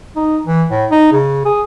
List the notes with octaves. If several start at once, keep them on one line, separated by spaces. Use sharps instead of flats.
D#4
E3
A2
D#4
C#3
G#4